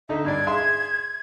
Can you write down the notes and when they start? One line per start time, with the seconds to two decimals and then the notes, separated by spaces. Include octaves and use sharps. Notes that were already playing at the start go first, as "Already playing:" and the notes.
0.09 D3 D#4 E5
0.25 G2 D4 D5 G#6
0.47 G#4 E5 C6